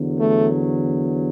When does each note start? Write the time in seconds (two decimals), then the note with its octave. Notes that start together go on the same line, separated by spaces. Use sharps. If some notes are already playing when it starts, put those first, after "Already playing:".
Already playing: E2 D3 F#3
0.19 A3